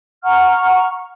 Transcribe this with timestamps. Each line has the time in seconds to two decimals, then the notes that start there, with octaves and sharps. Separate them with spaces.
0.23 F#5 A#5 C#6 F6